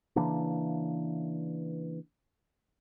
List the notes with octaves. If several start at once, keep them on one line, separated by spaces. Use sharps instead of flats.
C#3 E3 A#3 D4